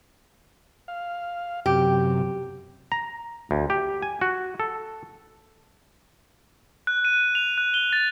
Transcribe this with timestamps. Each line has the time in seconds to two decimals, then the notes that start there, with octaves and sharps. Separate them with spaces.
0.88 F5
1.66 F#2 C3 G4
2.92 A#5
3.51 D2
3.70 G4
4.02 G#5
4.21 F#4
4.60 A4
6.87 F#6
7.05 D#7
7.35 F7
7.58 F#6
7.74 G7
7.93 A6